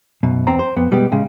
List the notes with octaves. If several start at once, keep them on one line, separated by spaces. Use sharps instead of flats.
B1 F#2 B2
E2 C4 A#5
C5
F2 B3
B2 G3 G#3 B3 G4
A2 C#3 G#3